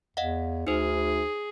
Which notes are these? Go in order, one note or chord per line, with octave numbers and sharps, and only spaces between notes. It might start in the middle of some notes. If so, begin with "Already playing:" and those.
E2 D#5 F5 F#5
D2 D#4 G#4 C5